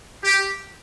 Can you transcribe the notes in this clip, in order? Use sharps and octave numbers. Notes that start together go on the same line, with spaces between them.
G4